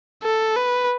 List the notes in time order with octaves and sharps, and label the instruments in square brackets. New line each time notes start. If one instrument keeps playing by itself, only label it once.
[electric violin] A4
B4